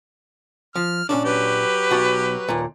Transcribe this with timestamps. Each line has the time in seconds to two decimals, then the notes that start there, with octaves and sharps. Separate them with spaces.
0.75 F3 F6
1.09 A#2 C#4 D4 D5
1.25 F#3 G4 B4
1.90 B1 F#4 A5
2.49 D#2 A#2